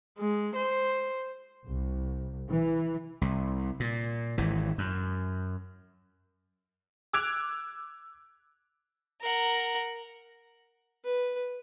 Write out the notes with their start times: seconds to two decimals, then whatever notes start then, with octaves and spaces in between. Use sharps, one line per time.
0.18 G#3
0.55 C5
1.65 C2
2.48 E3
3.21 C2
3.80 A#2
4.38 G#1 E3
4.78 F#2
7.13 D6 E6 F#6 G#6 D7 F7
9.21 A#4 F#5
11.04 B4